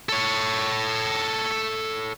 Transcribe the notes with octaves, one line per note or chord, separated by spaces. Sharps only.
A4 C#5